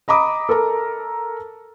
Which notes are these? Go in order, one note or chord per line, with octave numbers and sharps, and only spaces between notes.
D#5 A#5 B5 D6 D#6
A4 A#4 A#5